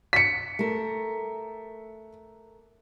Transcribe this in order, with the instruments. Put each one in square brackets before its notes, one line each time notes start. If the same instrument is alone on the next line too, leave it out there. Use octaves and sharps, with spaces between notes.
[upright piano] B6 C#7
[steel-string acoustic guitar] A3 A#4